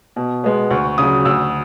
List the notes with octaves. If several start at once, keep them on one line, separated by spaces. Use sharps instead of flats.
B2
G#3 B3
D2 C#6
C#3 F#3 D#6
D2 E6